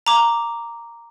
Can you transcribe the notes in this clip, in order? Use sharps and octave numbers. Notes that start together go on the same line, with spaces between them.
A#5 D6